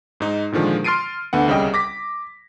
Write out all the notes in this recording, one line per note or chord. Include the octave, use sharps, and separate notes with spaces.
G#2 D#4
A#2 D3 D#3 F3 G#3
C6 F6 A6 C7 D7 D#7
D2 D3 B3 F#5
C2 C#3 G3 D#5 G5
D6 A#6 B6